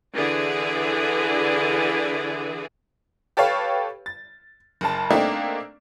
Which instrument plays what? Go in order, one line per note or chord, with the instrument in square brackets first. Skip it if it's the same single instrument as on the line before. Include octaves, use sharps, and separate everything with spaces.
[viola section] D3 E3 G#4 D5
[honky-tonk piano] G4 A4 B4 C#5 F5
A6
F#1 C#3 A5
A3 A#3 C4 D4 D#4